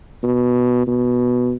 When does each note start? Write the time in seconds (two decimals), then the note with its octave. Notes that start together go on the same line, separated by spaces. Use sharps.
0.23 B2
0.87 B2